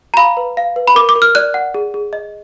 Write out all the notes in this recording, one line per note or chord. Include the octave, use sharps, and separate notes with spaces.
A#5
F5 B5
B4
F5
B4
B5
A#4 D6
D6
A#4
F6
D5 F#6
F#5
G#4
G#4
D#5